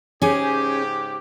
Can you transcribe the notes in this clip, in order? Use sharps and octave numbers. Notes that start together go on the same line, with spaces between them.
G#2 C#3 C#4 G4 G#4